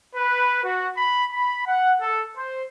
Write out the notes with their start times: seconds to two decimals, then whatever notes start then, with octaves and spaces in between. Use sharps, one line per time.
0.15 B4
0.63 F#4
0.97 B5
1.31 B5
1.66 F#5
2.01 A4
2.36 C5